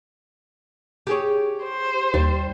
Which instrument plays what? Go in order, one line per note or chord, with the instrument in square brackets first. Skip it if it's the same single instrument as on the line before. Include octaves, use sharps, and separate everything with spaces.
[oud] G4 G#4 C#5
[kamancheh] C5
[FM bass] D#2 [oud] G3